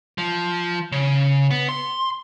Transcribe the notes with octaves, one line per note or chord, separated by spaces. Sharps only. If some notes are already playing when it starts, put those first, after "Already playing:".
F3
C#3
B3
C6